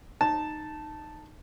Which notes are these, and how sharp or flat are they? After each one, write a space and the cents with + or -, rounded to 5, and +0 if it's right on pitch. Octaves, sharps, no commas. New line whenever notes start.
D#4 -15 A5 +0